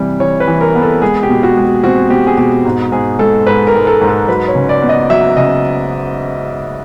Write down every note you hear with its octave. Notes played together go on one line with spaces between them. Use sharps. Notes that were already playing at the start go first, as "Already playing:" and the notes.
Already playing: C3 E3 G3
E3 C#5
B4
E3
A#4
B3
A4
G#3 G#4
G4
B2
F#4
G#3
G4
C4 F#4
B2 G4
G#4
B2 G4
G#2
G#2 G#4
G#3 A4
G#2 B4
A#4
G#2
A4
G#2
A4
F#3 B4
C#5
C#3
D5
B3
D#5
F#3 E5
C#3 D#5